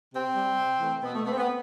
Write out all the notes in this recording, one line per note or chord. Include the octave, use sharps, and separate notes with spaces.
C3 C4
G3
C3
E3 A3
B2 B3
A3
A3 B3
C4
B3